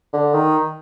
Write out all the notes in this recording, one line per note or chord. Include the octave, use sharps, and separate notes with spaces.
D3
D#3